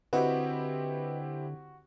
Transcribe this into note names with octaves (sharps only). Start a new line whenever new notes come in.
D3 C4 E4 F#4 G4 B4 D#5